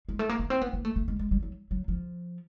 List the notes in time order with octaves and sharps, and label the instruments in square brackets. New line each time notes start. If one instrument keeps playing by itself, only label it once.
[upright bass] G#3
A3
A#3
B3
C4
B3
A#3
A3
A3
G#3
G#3
G3
F#3
F#3
F3